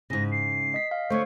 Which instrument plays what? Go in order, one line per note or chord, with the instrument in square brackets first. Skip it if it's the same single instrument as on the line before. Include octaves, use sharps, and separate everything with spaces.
[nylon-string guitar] G#2 C#3 [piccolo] A#6
[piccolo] C7
[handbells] D#5 B6
F5
[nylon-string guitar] D3 A3 [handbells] C5 C#5 [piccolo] C#6